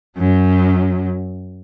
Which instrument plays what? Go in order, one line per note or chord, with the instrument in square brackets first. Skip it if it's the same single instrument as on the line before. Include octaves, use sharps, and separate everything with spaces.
[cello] F#2 F#3